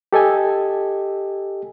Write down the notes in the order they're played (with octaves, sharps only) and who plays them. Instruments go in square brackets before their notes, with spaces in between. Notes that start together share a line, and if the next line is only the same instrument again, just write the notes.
[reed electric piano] G4 A4 D#5 G#5